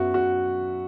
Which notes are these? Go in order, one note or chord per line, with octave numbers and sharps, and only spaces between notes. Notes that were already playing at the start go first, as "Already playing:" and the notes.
Already playing: F#2 F#3 B3 F#4 E5
F#4